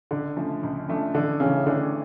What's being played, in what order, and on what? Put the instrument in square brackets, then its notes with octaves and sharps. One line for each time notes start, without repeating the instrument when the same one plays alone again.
[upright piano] C#2 [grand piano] D3
[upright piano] C#3 F3 A3 D4
C#2
C#3 F3 A3 D4
[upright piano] A1 [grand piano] D3
[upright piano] A2 E3 A3 [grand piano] C#3
[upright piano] A1 [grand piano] D3